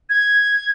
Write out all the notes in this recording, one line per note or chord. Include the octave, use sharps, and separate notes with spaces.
G#6